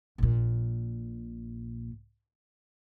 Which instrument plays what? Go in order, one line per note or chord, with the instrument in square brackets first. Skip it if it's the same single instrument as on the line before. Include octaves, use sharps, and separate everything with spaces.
[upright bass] A#1 A#2